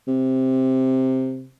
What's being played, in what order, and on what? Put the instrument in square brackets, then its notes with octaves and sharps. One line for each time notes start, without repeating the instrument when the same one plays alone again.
[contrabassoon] C3